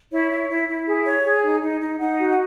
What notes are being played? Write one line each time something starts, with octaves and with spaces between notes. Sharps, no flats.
E4 C#5
E4
E4
E4
G#4
C#5
G#4
D#4
D#4
D#4
D#4 F#5
F#4
F#5